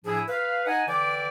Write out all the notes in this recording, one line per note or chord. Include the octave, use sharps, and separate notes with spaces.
A2 F3 D4 E4 G#4
B4 F5
D#4 D#5 F#5 G#5
D3 E3 B4 D5 G5 D6